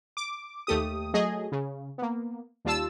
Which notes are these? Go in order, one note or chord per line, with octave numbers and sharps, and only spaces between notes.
D6
D#2 A3 G4 D#6
F#3 A3 G#4 D#5
C#3
A#3 B3
D#2 G3 F4 A5 E6